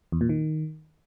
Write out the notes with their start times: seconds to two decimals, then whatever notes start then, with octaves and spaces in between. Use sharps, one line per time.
0.12 E2
0.21 A#2
0.29 D#3